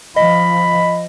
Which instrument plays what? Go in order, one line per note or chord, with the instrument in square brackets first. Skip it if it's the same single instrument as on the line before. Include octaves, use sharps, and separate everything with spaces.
[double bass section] F3 [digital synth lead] D#5 [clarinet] B5